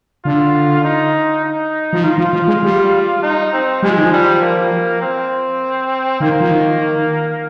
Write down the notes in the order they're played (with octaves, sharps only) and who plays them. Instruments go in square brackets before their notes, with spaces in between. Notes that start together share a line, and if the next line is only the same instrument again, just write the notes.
[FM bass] D3 [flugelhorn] F4
[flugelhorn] D#4
D#4
[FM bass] F3
[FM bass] D#3 [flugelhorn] F4
[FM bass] F3
F3
G#3
G3
[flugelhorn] D#4
C4
[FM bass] G3 [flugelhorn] G#3
[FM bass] F3
D#3
F3
[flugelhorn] G3
A#3
C4
[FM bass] D#3 [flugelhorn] A#3
[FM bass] F3
D#3